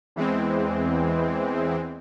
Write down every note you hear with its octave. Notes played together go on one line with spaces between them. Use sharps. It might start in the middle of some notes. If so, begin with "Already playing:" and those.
E2 E3 G#3 C4